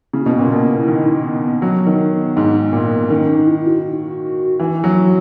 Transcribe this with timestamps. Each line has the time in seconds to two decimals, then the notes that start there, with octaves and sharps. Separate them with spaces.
0.13 C#3 E4
0.22 F#4
0.26 B2 E4
0.39 A#2
0.51 B2
0.88 D#3 E4
1.06 D#4
1.25 B3
1.44 B3
1.62 F#3 B3
1.87 D#3
2.37 G#2
2.73 A#2
3.10 D#3 C#4
3.29 D#4
3.47 E4
3.67 F#4
4.59 E3
4.84 F#3